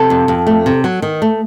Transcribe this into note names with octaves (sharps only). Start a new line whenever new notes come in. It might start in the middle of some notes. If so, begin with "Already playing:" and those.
Already playing: C3 A4
F2
F2
A3
C3
F#3
D#3
A3